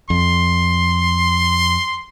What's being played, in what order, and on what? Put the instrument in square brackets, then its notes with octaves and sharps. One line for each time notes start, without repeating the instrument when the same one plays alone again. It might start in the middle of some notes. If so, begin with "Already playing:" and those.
[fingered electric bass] F2 [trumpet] C6